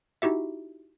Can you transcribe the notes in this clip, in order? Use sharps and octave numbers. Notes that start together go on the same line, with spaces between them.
D#4 E4 F#4 G4 E5